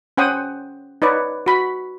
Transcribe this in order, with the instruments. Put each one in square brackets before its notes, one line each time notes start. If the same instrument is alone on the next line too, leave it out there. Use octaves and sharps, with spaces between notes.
[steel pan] C#4 C5 F#5 G5 D#6
D#4 B4 C#5 D5
F#4 B5